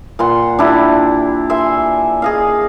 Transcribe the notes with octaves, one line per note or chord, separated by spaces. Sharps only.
A#2 F#5 C6
D4 E4 G4
E5 G#5 C6
G#4 D#5 F5